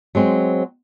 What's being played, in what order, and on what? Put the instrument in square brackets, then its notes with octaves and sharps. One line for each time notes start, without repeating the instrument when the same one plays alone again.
[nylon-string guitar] F#3 G#3 C4